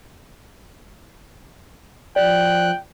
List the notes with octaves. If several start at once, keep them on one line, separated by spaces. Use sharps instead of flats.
F3 D5 G5 F#6